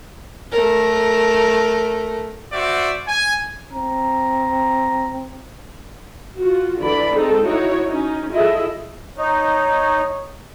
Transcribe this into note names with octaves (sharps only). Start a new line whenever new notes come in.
A3 A#4
F#4 C5 D5 E5
G#5
C4 A#5
F4 F#4
D3 E3 D5 B5
G#3 C4 D#4 A4
D#4 E4 F#4 C#5
C#4 D#4
E4 F4 G#4 A4 D#5 E5
D#4 C#5